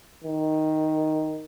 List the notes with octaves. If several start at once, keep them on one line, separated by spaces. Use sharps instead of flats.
D#3